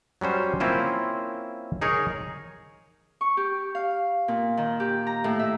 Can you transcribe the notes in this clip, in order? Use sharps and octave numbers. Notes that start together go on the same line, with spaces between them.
F#3 G3 C#4 C5
A#3 C4 C#4 E4 F4 C5
D#4 G#4 A#4 C#5
C#6
G4
F5
A#2
D#3
G4
A#5
A2
E5